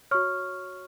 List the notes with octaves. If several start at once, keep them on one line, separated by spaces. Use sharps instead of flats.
F#4 C#5 C#6 F6